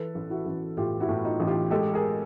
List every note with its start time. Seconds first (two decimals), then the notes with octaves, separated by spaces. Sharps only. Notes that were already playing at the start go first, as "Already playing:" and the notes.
Already playing: E3 A4 B4
0.15 A1
0.30 E4 F#4
0.46 A1
0.77 A2 F4 G4
1.00 E4 F#4
1.09 A2
1.24 D#4 F4
1.40 A1
1.47 F4 G4
1.71 G#3 G4 A4
1.94 G#4 A#4